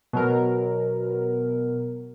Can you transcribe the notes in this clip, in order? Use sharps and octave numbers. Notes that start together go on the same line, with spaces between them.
B2 F#3 A#4